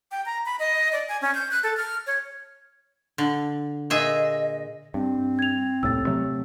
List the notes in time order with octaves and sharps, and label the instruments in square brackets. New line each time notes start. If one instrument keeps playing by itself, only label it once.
[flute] G5
A#5
B5
D#5
D5
G#5
C#4
G6
F#6
A4
F6
C#5
[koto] D3
[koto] A#2 G#4 E5 [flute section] D#5
[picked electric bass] G2 [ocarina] C4
[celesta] G#6 F7
[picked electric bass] D#1 C2 A2 [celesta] E6 A6
[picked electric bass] C3 F#3 A3